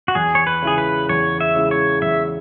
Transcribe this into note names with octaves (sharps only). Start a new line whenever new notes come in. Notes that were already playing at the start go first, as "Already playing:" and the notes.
F#4
E2 G#4
C#5
B4
C#3 G#3 E4 G#4
B4
E2 C#5
E5
C#3 G#3 E4
C#5
E2 E5